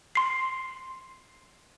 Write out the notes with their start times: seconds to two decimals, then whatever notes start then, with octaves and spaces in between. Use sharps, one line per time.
0.15 C6 C7